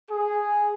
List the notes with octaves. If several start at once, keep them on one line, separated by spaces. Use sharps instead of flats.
G#4